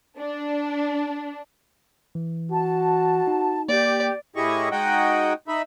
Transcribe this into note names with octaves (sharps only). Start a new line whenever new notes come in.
D4
E3
F#4 A5
D#4
A#3 G4 D5
A2 E4 G4 G#4 D#5 C#6
G#3 D#4 F#4 D#5 F#5 G5
D#4 E5 B5